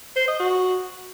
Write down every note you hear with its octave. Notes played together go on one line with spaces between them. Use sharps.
C5
D#5
F#4